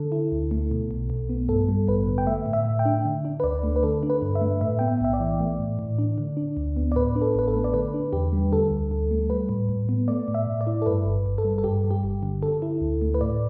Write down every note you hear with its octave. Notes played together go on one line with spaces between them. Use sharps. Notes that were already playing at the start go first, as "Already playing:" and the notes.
Already playing: D3 A4
E4
D2
A3
B2
B1
B1
B3
G2 A4
G3
A1 B4
D3
G5
A3 E5
A2
E5
A2
G5
D4
D3
D4
B4
D2 D5
A3
B4
D3 A4
D4
B4
G2
E5
A3
A2 E5
B3 G5
E5
B1 E5
D5
E3
A3
A2
A2
D4
D3
D4
D2
B3
D5
A2 B4
D4
A4
A1 B4
A4
A3
D5
D3 B4
D4
E2 G4
G3
D3 A4
D2
D2
A3
G3 B4
A2
A2
B3
A3 D5
A2
E5
A2
D5
E4
A4
G2 B4
G1
G1
A4
G3
A4
G2 G4
G3
G4
G1
D3
D3 A4
E4
D2
A3
B4
A2 D5